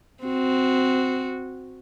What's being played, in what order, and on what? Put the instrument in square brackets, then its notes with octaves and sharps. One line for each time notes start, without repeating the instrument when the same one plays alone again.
[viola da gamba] C4 F#4